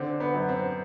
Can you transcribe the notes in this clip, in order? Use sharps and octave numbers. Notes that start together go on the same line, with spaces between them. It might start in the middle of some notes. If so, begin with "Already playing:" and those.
Already playing: D3 C4
B3
F#2
C4